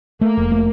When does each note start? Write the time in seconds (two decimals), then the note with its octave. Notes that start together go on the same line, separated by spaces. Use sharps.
0.21 A3 A#3
0.37 F1
0.52 A3